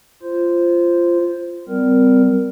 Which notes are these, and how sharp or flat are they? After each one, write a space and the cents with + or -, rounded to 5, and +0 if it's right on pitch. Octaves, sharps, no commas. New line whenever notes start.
F4 -15 C5 +0
G3 -10 C4 -40 A#4 +0